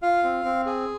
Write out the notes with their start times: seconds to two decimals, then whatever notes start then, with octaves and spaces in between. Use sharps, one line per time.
0.02 F4 F5
0.24 C4
0.45 C4
0.66 G#4